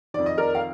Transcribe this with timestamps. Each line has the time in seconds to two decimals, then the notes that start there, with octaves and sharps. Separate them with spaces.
0.14 F2 D#3 D5
0.26 D#5
0.38 A#4 D5
0.55 F5